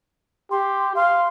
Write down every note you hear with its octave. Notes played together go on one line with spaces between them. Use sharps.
G4 C6
F5 C6